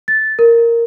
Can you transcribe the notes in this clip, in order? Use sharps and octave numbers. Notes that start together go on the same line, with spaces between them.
A6
A#4